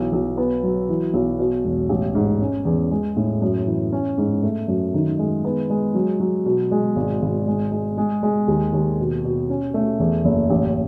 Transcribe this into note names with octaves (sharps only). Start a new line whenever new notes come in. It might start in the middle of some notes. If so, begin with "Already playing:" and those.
Already playing: B1 E3
B1
B3
F#3
E3
B1
B2
E1
A1
G#2
C#4
E2
G#3
A2
F#2
E3
C#4
G#2
A3
F#2
D#3
G#3
B3
G#3
F#3
F#3
B2
G#3
G#1
G#1
G#3
G#3
G#3
G#3
D#2
D#2
B2
B2
C#4
A3
E2
F#1
A1